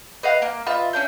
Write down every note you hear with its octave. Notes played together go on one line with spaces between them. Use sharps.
B4 D#5 F5 F#5
A#3
F4 B4 D#5 E5
C#4 D4 G5